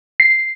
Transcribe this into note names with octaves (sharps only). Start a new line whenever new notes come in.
C7